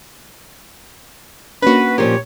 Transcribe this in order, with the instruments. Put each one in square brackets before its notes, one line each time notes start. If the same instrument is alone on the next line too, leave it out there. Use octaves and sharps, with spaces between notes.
[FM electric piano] A#3 C#4 D4 [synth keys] F#4 B4 [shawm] B5
[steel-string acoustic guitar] A#2 F3 A#4 [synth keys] G4 [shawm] C#5